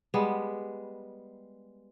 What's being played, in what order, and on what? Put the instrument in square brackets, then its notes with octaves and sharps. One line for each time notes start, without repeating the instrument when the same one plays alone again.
[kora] G3 G#3 B3